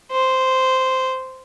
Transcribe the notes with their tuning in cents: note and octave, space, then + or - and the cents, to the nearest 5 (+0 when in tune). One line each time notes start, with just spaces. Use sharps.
C5 -10